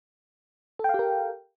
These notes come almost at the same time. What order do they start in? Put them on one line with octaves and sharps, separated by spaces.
A4 G5 F5 G4 A#4